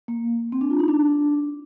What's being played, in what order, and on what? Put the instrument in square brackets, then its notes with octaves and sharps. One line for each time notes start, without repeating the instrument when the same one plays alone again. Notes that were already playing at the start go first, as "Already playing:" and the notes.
[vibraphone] A#3
C4
D4
F4
D#4
D4